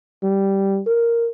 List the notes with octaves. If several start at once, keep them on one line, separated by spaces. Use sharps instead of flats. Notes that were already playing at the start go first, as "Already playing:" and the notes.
G3
A#4